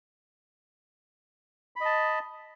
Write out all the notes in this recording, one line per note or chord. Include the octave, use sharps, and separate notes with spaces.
D#5 A5 B5